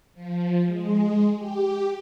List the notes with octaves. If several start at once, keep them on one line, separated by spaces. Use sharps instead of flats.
F3
G#3
G4